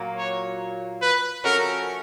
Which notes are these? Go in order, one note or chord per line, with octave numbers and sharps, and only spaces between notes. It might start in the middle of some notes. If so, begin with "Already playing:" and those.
Already playing: A#2 F#3 A#3
C#5
B4
F3 A3 C#4 F#4 A#4